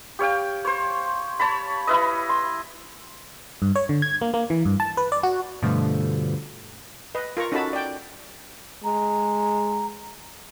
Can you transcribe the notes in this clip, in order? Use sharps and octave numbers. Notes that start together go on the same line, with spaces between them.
G4 C#5 F5 G5
C5 C#5
C#5 A5 B5
E4 B4 D#5
C6
G2
C#5
D3
G#6
A#3
A#3
E3
G2
A5
B4
D5
F#4
G2 B2 D3 F3 A3
B4 D#5
F4 A#4 A#5 C#6
C#4 D#4 F#4 A4 A5 B5
D5 G5
G#3 A#5